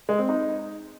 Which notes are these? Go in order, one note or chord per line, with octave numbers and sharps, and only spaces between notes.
G#3
C4
D#4